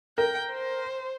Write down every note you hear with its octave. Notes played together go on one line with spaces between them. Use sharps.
A#4 G5
C5